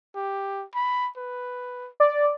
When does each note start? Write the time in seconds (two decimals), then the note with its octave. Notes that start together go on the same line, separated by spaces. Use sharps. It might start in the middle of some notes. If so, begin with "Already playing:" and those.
0.15 G4
0.75 B5
1.17 B4
2.00 D5